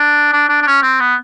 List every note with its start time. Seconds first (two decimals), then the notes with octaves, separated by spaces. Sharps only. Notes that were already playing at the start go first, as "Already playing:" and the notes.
Already playing: D4
0.33 D4
0.49 D4
0.62 D4
0.67 C#4
0.82 C4
1.00 B3